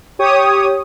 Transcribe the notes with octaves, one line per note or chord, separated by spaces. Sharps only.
G4 C#5 D#6